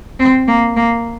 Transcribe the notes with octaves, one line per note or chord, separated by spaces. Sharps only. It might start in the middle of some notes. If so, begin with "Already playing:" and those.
C4
A#3
A#3